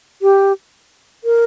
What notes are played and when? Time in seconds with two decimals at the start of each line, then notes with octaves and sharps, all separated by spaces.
0.22 G4
1.24 A#4